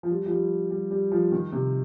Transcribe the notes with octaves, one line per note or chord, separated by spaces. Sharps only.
F3
G3
F3
G3
G3
G3
F3
D#3
C3